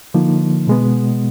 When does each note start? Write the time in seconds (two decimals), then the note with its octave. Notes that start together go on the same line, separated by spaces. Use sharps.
0.14 D3 F3 A#3 D#4
0.67 B2 G#3 B3